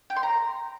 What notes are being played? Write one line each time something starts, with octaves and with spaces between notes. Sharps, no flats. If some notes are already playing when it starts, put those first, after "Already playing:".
G5
C6
A#5